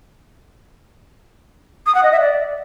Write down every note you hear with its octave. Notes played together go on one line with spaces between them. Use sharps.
D#6
F#5
D#5
E5
D5